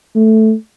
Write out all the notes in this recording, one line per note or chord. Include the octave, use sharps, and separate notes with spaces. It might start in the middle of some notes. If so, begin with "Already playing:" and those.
A3